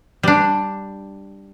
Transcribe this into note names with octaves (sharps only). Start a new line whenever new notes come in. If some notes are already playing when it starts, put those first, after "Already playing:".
G3 D4